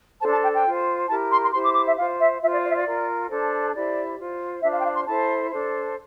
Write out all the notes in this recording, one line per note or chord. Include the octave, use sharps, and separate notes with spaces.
D4 A4 C5 A5
A5
G5
G5
F4 C5
E4 G4 A#4 A5
C6
C6
E4 G4 C5 C6
D6
D6
E5
F4 C5 F5
E5
F4 C5 E5
D5
D5
E5
D5
F4 A#4
D4 A4 C5
E4 G4 C5 D5
F4 C5
D4 F4 C5 E5
F5
G5
F5
C6
E4 A4 C5 A5
D4 A4 C5